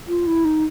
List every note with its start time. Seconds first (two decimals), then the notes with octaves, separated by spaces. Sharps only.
0.08 F4
0.27 E4
0.45 D#4